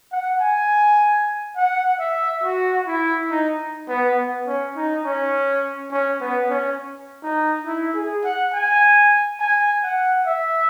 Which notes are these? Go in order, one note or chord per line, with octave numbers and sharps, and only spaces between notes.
F#5
G#5
F#5
E5
F#4
E4
D#4
B3
B3
C#4
D#4
C#4
C#4
B3
C#4
D#4
E4
G#4
F#5
G#5
G#5
F#5
E5